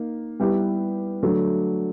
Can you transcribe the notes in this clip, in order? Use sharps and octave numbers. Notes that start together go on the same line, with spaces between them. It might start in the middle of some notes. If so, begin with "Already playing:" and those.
Already playing: A#3 D#4
G3 B3 E4 G4 B4
D3 F#3 A3